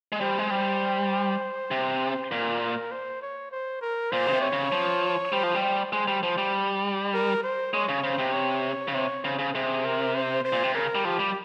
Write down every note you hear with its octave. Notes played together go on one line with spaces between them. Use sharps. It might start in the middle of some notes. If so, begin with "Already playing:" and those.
G#3
G3 C5
G#3
G3 C5
C3
A#2 A#4
C5
C#5
C5
A#4
A#2 C5
C#3
C3
C#5
C#3
F3
G3 C5
F3
G3
C5
G#3 C5
G3
F3 C5
G3
A#4
C5
G#3 C#5
C#3
C#3 C5
C3
C#5
C#3
C3 C#5
C#3 C5
C#3
C3 G#4
A#4
C5
C5
A#2
C3
C#3 A#4
G3
F3 G4
G3